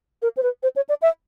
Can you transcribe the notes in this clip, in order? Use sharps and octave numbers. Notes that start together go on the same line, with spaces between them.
A#4
C5
B4
C5
C#5
D5
E5